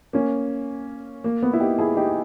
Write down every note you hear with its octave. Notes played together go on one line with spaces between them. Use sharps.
A#3 C#4
A#3
B3
E4
D#4 G4
E4 G#4
D#4 G4